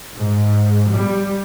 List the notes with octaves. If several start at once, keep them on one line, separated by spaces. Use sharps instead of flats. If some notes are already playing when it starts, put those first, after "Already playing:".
G#2
G3